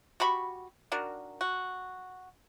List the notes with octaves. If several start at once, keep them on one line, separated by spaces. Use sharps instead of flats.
F#4 G4 B5 C#6
D#3 D4 F#4 A#4
F#4